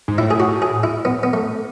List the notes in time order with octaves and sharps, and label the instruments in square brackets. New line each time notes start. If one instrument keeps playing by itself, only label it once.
[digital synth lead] G#2
[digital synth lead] A2 [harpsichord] E4
[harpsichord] G#4
F#4
G#4
E4
B3
B3
A3